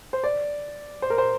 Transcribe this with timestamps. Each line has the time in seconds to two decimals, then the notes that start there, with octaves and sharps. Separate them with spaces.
0.13 C5
0.24 D5
1.02 C5
1.10 A#4
1.18 C5